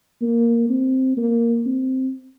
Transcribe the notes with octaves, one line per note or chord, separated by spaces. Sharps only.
A#3
C4
A#3
C4